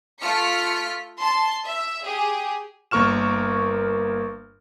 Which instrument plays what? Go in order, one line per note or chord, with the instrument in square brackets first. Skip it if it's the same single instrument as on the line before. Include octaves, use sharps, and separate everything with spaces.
[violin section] A3 F4 F6 B6 C#7
A5 C6
E5
G4 G#4
[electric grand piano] G1 A#3 A#4 C#6 F6 E7